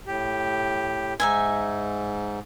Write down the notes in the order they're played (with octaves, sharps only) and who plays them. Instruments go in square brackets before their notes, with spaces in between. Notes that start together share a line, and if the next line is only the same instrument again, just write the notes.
[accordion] A2 G4
[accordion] G#2 [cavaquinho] D#4 E5 G#5